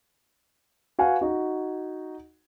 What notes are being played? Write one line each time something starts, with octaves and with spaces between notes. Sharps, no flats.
F#4 B4 F5 F#5 G#5
D#4 F#4